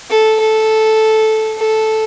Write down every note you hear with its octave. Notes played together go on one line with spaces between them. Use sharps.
A4
A4
A4